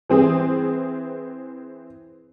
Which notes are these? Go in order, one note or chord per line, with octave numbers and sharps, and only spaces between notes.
E3 C4 G#4